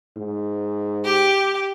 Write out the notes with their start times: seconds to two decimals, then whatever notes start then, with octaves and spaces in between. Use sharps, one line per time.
0.17 G#2
1.04 G4